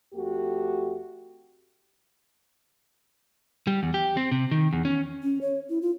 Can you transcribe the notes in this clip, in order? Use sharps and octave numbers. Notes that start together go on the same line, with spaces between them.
F2 A3 F#4 G4
G3
E2
G4
C4
C3
D#3
E2
C#4
C#4
C#5
E4
F4